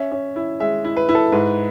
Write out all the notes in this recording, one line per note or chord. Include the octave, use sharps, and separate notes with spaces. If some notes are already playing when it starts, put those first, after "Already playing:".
Already playing: C#4 E5
C#4
E4
G#3 E5
E4
B4
E4
A4
G#2 B4